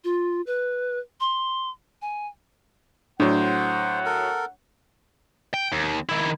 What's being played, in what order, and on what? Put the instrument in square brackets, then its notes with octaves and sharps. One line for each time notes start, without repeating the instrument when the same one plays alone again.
[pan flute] F4
B4
C6
G#5
[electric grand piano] A2 F#3 [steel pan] D4 [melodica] C5 [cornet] F#5
[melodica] A4 A#4
[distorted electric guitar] G5
D#2
D#3 E4